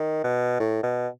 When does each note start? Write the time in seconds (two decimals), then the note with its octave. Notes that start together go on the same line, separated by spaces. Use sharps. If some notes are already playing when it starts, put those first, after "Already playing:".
Already playing: D#3
0.24 B2
0.60 A2
0.83 B2